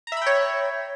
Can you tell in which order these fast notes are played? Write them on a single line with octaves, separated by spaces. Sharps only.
A#5 E5 B5 G5 C#5